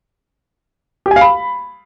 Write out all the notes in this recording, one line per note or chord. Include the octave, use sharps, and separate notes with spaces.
G4
G#5
F5
B5